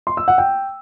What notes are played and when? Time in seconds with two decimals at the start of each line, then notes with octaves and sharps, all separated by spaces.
0.07 C6
0.17 E6
0.28 F#5
0.38 G5